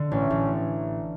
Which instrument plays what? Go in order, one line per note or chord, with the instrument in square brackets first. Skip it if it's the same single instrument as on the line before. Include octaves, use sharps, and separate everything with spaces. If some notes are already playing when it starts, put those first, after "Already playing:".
Already playing: [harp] D3
[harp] A1 [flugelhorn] C#4
[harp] A1